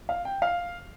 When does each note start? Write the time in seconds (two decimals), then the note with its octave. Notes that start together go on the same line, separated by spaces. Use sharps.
0.09 F5
0.25 G5
0.42 F5